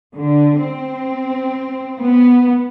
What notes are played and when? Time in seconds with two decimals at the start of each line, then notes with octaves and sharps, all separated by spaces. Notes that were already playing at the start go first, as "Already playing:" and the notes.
0.15 D3
0.61 C4
2.00 B3